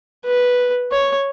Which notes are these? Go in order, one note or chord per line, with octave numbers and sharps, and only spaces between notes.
B4
C#5